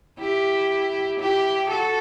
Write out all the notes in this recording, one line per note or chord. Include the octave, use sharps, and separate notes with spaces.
E4 G4
E4 G4
F#4 A4